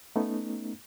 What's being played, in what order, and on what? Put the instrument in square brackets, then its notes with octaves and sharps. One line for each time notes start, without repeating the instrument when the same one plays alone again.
[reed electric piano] A3 B3 C#4 D#4